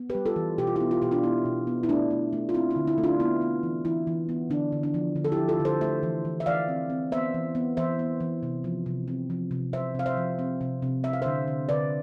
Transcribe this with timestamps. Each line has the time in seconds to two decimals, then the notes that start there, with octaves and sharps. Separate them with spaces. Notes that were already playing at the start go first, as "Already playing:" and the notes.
Already playing: B3
0.10 G4 B4
0.15 G3
0.26 F4 A4
0.36 E3
0.58 B2 G4
0.67 F4
0.76 B3 E4 G4
0.91 F4
1.02 B2 G4
1.11 D4 F4
1.23 B3 E4
1.45 B2
1.67 B3
1.83 E4
1.89 A3 D4
2.10 A3
2.33 A3
2.49 F4
2.54 C4 E4
2.71 E4
2.76 D3
2.87 E4
2.98 A3
3.03 D4 F4
3.20 B3 E4
3.41 B3
3.63 E3
3.85 E3 E4
4.07 E3
4.29 B3
4.50 D3 D4
4.72 D3
4.83 D4
4.94 F3
5.16 D3
5.25 A4
5.32 E4 G4
5.37 F3
5.48 F4 A4
5.60 D3
5.65 A4 C5
5.81 A3 C5 E5
6.03 E3
6.25 E3
6.40 E5
6.46 E3 D5 F5
6.68 C4
6.90 C4
7.12 B3 C5 E5
7.34 E3
7.55 B3
7.77 E3 C5 E5
7.99 B3
8.20 E3
8.43 C3
8.64 F3
8.86 C3
9.08 C4
9.30 F3
9.51 C3
9.73 C3 C5 E5
9.95 C3 F5
10.06 C5 E5
10.17 F3
10.39 C4
10.61 C3
10.82 C3
11.04 C4 E5
11.13 F5
11.22 D3 C5 E5
11.48 D3
11.69 D3 B4 D5